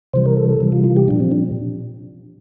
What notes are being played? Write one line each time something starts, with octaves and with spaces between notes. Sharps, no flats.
C3 E3 G3 C5
A#4
A4
A4
C3 E3 G3
F4
F4
G4
A#2 F3 D4
C4
D4